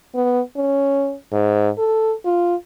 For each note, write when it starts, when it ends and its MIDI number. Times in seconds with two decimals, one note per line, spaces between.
0.15 0.41 59
0.57 1.15 61
1.32 1.69 44
1.78 2.14 69
2.25 2.55 65